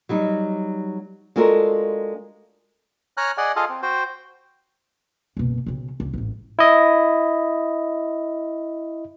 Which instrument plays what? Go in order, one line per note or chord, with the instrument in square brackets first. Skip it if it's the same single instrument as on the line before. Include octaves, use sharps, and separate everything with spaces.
[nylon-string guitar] F#3 G3 D#4
G#3 D4 F4 F#4 A4 A#4
[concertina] C#5 G#5 A#5 F6 F#6
G#4 D5 D#5 F#5 G#5
F4 G#4 A4 D#5 F5
C4
F#4 C5 G5
[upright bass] F#1 B2
B1 C#3
C#2
A1 G#2
[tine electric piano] E4 D#5